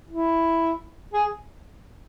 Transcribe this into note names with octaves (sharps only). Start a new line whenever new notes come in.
E4
G#4